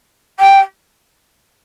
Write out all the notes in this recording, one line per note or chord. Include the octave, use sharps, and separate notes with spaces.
G5